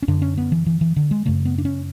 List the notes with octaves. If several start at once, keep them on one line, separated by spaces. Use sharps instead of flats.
C#4
F#2 D3 D4
C#4
B3
E3
E3
E3
D3
G#3
F#2 C#3 A3
B3
D4
C#4